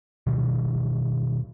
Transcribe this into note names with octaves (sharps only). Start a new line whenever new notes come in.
B2 D#3 F3 G3